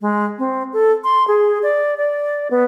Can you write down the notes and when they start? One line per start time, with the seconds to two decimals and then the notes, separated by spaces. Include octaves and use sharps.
0.01 G#3
0.38 C4
0.73 A4
1.04 C6
1.28 G#4
1.63 D5
1.97 D5
2.51 B3